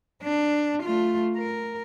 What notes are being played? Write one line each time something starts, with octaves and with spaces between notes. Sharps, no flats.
D4
A3 F4
A#4